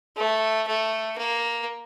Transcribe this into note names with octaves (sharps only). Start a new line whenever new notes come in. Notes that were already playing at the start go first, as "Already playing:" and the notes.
A3
A3
A#3